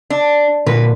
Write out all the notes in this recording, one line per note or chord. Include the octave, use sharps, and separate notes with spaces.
D4
A#2 D3 A#4 B4